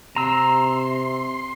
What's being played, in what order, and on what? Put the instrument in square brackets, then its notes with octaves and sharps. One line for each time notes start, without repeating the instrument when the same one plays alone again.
[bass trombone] C3 [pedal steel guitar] A#5 E6 [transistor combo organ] C6